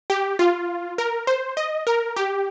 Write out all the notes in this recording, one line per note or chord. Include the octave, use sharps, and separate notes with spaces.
G4
F4
A#4
C5
D#5
A#4
G4